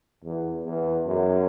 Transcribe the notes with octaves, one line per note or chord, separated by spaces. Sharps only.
E2
E2
F#2